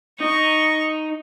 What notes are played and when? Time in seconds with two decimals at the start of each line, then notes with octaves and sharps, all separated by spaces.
0.21 D#4 D#5 C#6